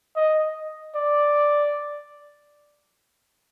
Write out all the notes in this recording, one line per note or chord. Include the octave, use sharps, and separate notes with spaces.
D#5
D5